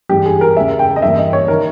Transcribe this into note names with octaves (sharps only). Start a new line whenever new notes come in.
G2 E3 G#3 G4
G#4
A#4
E2 C#3 G#3 E5
G5
D#5
G2 E3 A#3 E5
D#5
C#5
D#3 A#4